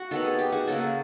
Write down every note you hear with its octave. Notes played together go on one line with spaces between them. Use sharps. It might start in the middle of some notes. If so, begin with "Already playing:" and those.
Already playing: F#4
D#3 F#3 B3 A4
G#4
G4
F#4 G#4
C#3 F#3 A#3 A4
G#4